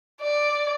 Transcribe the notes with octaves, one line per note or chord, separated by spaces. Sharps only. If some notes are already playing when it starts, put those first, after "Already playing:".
D5